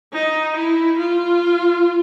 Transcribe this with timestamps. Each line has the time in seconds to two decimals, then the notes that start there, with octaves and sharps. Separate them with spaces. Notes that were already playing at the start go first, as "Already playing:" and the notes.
0.13 D#4
0.56 E4
0.98 F4